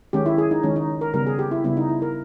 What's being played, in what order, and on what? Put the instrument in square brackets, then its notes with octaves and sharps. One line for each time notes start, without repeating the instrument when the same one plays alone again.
[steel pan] D#3 G#3 C#4 G4
E4
G#4
D#4
D#3 G#3 C#4
D#4
A#4
C#3 G3 B3 A#4
G#4
G4
E4
C#3 G3 B3 E4
D#4
E4
A#4